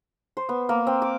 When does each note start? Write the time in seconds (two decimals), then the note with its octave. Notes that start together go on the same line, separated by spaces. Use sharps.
0.37 C5
0.49 B3
0.69 A#3
0.87 C4
1.02 D6